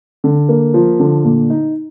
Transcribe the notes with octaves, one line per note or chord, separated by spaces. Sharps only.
D3
A#3
F3
D3
A#2
D#4